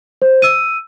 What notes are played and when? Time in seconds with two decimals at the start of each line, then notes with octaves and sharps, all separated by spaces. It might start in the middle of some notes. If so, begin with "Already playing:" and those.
0.22 C5
0.42 E6 D#7